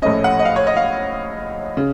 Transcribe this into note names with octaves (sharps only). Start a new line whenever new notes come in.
A#1 A2 A3 C#4 D#5
F#5
D#5
F5
C#5
D#5
F5
C#3